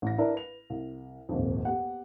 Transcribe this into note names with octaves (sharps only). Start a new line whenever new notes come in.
A1 A#6
D4 E4 A#4 B4 D5 E5
B4 F7
C2
D#1 G#1 F2
B3 G4 F#5